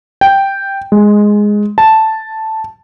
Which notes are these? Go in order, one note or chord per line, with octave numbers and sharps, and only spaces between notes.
G5
G#3
A5